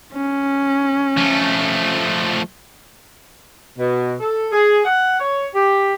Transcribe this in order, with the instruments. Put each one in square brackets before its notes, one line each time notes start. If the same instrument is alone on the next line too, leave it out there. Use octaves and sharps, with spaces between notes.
[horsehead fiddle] C#4
[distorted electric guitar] F3 A3
[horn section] B2
A4
G#4
F#5
C#5
G4